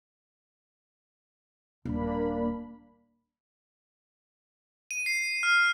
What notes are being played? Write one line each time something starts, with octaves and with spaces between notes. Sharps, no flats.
D#1 A#3 D4 B5
D#7
C7
F6